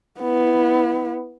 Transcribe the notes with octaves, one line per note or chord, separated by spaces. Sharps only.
B3 E4